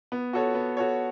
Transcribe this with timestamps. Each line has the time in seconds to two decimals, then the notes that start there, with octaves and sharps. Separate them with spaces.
0.12 B3
0.33 F#4 A4 C#5
0.55 B3
0.77 F#4 A4 C#5